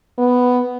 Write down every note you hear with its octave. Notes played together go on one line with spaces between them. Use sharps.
B3